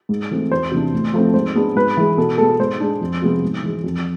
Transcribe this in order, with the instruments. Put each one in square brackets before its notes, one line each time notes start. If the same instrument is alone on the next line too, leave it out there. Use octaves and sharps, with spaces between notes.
[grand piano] G#2
E3 A3 C4
E2 C5
C3 E3 B3 D4
A2
F3 A3 C4
G#2 C5
G#3 B3 D4
G#2 B4
E3 G#3
B2 A4
G#3 B3 A4
G#2 C5
G#3 D4
F2
C3 F3 G#3 B3
G#2
E3 G#3
F2